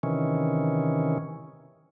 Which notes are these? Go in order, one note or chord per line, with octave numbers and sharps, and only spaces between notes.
C3 D#3 E3 C#4